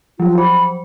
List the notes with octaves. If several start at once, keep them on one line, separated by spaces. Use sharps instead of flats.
F3 F#3 F4
C5 B5